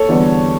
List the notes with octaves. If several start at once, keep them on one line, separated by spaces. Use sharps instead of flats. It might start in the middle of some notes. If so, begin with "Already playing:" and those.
Already playing: A4 C#5
E2 D3 G3 B3